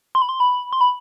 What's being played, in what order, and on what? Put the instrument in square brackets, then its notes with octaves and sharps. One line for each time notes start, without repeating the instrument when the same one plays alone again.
[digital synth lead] C6
B5
C6
B5
C6
B5